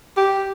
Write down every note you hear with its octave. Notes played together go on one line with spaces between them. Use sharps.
G4